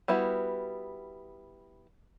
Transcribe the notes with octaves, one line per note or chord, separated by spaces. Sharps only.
G3 B3 E4 F#4